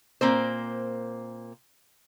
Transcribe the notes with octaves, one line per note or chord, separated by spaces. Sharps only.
A#2 A#3 C4 C5